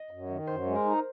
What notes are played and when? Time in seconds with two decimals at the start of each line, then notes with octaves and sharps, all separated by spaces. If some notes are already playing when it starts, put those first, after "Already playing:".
Already playing: D#5
0.11 F#2
0.29 D#3
0.47 F#2 C5
0.66 G#3
0.75 A#4
0.84 D#4